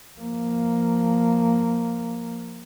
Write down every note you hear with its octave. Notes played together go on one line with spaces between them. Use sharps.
F3 A#3